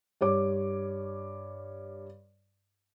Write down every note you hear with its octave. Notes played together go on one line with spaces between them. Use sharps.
G2 C#5 D6